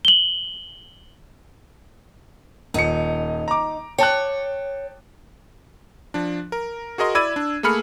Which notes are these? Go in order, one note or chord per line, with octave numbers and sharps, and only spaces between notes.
F#7 G7
D#1 D#4 C#7
A#5 D6
C#5 G5 A5 F#6
F3 D4
A#4
F#4 G#4 A#4 D#5 C6
E4 D5 B5 E6 G#6 D#7
D4
A3 A#3 G#4 B5 F6 C#7